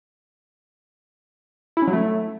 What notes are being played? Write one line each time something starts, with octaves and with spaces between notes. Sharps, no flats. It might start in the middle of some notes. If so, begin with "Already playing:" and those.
E4
C#4
F#3
A3